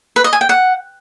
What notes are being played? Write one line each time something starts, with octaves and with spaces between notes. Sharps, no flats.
B4
D#5
G#5
G5
F#5